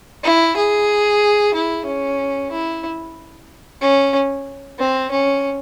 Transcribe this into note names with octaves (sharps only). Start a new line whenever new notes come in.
E4
G#4
E4
C#4
E4
C#4
C4
C#4